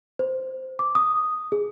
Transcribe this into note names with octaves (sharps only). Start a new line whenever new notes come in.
C5
D6
D#6
G#4